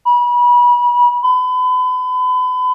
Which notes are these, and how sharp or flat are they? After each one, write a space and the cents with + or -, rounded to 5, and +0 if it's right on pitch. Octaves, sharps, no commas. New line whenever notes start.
B5 -30
B5 +35